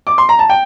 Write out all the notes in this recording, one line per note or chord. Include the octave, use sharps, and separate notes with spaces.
D6
C6
A#5
A5
G5